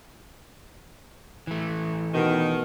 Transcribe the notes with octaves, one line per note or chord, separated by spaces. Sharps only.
E3 A3
B2 D#3